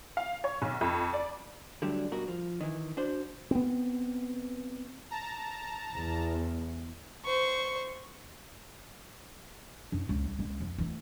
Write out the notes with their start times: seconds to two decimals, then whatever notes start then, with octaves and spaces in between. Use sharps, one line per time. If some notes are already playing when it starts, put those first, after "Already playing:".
0.17 F5
0.44 C#5
0.62 B1
0.81 F2
1.13 D5
1.82 D3 F#3 G3 A3 D4
2.12 G2 B2 F#4 A#4
2.28 F3
2.61 D#3 E3
2.97 D4 F#4 C5
3.51 B3 C4
5.11 A5 A#5
5.94 E2
7.24 C5 C#6
9.92 F#2 D#4
10.09 C#2
10.25 G3
10.39 C#2 G#3
10.60 F2 F3
10.78 E3 A3